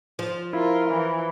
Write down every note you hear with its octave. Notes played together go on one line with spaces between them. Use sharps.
F3
E4 F4 A#4
E3